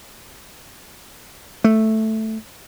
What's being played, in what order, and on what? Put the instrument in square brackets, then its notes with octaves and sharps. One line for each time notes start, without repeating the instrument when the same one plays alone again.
[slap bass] A3